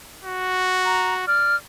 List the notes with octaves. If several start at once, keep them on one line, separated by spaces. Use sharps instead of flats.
F#4
A#5
D5 F6